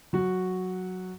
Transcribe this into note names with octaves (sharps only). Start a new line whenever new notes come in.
F#3 F#4